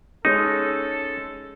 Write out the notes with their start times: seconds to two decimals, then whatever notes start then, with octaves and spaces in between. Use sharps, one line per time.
0.25 G#3 C#4 D#4 A4